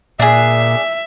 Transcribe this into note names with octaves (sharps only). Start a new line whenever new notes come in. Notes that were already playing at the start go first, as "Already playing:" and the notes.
A#2 D4 G#4 E5